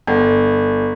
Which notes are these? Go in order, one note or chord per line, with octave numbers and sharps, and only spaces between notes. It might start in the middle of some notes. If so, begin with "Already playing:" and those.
G1